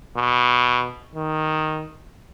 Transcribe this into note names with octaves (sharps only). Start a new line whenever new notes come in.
B2
D#3